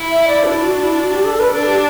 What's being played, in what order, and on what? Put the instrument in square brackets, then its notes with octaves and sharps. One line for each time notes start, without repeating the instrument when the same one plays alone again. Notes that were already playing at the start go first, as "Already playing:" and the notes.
Already playing: [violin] E4
[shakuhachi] E5
D5
[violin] D4 [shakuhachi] E4
[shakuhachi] F#4
E4
F#4
G4
A4
B4
[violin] D4 [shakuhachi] A4
[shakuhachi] G4